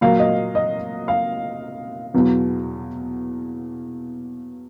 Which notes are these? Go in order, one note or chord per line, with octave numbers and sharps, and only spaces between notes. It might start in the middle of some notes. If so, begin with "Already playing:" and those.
A#2 F#3 A#3 F5
D#5
D#5
F5
E2 B2 F#3 B3